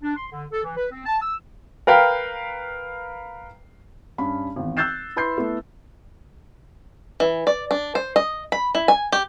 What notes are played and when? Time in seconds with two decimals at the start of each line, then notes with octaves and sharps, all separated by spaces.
0.03 D4
0.16 C6
0.31 D3
0.52 A4
0.64 E3
0.77 B4
0.92 C4
1.06 A5
1.22 E6
1.87 A#4 B4 F5 G5
4.18 G2 C#4 B5
4.56 G#1 E2
4.77 E6 F#6 G6 A6 C7 E7
5.16 E4 B4 B5 C6 G6 C7
5.37 A3 B3 E4 A4
7.20 E3
7.47 D5
7.71 D4
7.95 C5
8.16 D#5
8.52 B5
8.75 E4
8.88 G#5
9.12 G4